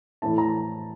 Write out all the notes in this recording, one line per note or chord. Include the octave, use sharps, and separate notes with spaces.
A2 E3 A3 E4 A5
A#5